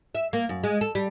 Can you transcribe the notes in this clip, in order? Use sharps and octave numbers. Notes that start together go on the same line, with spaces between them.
E5
A#3
F#2
G#3
A4
G3